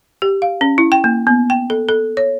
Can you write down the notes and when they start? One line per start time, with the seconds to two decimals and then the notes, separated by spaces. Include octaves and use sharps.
0.22 G4
0.42 F5
0.61 C#4
0.78 E4
0.92 G5
1.04 A#3
1.27 B3
1.50 G5
1.70 A4
1.89 A4
2.17 C#5